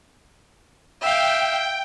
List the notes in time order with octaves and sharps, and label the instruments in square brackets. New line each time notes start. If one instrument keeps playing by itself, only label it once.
[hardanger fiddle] E5 F5 [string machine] G5